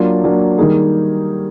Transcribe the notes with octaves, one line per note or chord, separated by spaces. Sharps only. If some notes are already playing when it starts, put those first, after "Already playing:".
Already playing: F#3 A#3 D4 F4
F#3 A#3 D4 F4
D#3 G3 A#3 D#4 G#4